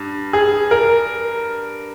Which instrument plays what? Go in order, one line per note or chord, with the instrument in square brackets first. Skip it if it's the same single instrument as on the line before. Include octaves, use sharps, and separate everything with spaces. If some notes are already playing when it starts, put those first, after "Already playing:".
Already playing: [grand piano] G2
[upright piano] G#4
A#4